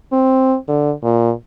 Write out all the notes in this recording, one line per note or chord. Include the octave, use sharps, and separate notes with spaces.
C4
D3
A#2